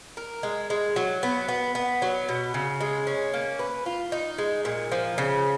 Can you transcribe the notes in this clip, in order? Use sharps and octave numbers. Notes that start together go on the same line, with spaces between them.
A#4
G#3
G#3
F#3
B3
B3
B3
F#3
B2
C#3
G#3
C#4
A#3
B4
F4
D#4
G#3
A#2
F3
C#3